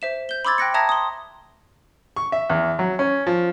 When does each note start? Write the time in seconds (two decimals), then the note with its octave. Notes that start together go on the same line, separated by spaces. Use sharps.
0.02 C5 E5 E7
0.29 G6 G7
0.45 B5 C6 D6 E6 G#6 A6
0.58 G5 F#6 A#6 C#7
0.74 E5 A5 A#5 D#6 G#6 A#6
0.89 C6 D#6
2.16 C#6
2.32 E5
2.50 E2
2.79 F#3
2.99 C#4
3.27 F3